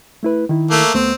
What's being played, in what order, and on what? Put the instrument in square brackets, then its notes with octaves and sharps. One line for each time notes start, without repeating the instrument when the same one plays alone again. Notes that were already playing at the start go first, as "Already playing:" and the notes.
[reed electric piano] A3 E4 B4
D#3 E4
[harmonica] A3 A#3
[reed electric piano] D2 A3 B3 [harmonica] C4